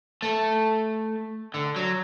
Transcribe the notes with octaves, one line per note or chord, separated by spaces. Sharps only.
A3
D3
F#3